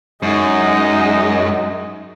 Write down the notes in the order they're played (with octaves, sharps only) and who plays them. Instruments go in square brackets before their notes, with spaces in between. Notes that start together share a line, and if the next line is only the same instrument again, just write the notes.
[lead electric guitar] F#2 [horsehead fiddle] G#3 D#4 [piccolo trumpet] D#5